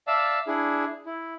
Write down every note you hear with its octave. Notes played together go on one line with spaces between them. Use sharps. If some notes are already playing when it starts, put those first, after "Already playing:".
D5 E5 F5 A5 E6
D4 E4 G#4
E4